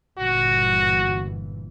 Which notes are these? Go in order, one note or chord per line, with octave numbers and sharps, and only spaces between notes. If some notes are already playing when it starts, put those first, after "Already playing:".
G1 A#2 E3 F#4